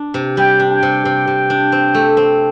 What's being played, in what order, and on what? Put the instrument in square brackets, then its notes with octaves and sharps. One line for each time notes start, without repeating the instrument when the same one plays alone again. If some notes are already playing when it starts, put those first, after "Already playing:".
Already playing: [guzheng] D4
C3
[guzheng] G3 [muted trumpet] G5
[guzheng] D4
[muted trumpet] G5
[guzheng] C3
C3
C3
D4
C4
A3
C4